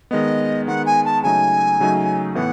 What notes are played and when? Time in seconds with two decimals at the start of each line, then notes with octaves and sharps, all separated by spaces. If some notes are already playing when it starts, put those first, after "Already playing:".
0.11 D#3 G#3 B3 D#5
0.67 D#3 G#3 B3 F#5
0.86 G#5
1.05 A5
1.23 C#3 F#3 A3 D#4 G#5
1.80 C#3 F#3 A3 D#4
2.35 A2 E3 B3 F#5